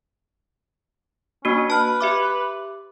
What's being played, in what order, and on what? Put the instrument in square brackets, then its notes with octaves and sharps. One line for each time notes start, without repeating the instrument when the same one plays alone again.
[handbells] A#3 D4 F#4 [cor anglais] C#4
[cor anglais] B4 [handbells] A5 F6
[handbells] G4 E5 D6